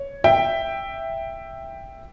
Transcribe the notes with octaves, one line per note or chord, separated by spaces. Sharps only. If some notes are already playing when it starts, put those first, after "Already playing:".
Already playing: C#5
E5 G5